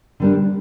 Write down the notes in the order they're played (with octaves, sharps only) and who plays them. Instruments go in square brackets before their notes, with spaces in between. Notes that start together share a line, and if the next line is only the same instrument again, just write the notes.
[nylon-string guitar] D3 G3 A#3 D4